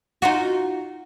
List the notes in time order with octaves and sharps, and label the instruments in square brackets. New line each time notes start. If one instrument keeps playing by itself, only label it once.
[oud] D#4 F4 F#4